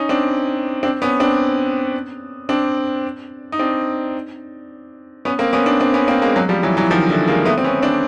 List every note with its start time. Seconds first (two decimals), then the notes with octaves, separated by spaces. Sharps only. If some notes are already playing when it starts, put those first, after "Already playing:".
Already playing: C#4 D#4
0.09 C4 D4
0.83 C4 D4
1.02 B3 C#4
1.20 C4 D4
2.49 C4 D4
3.52 D#4
3.59 C4 D4
5.25 B3 C#4
5.39 A#3 C4
5.53 B3 C#4
5.66 C4 D4
5.80 C4 D4
5.94 B3 C#4
6.08 A#3 C4
6.22 G#3 A#3
6.36 F#3 G#3
6.49 F3 G3
6.63 E3 F#3
6.77 E3 F#3
6.90 D#3 F3
7.09 D3 E3
7.27 G#3 A#3
7.46 A3 B3
7.58 C4
7.64 B3 C#4
7.83 C4 D4